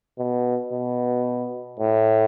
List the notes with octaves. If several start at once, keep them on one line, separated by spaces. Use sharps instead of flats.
B2
B2
A2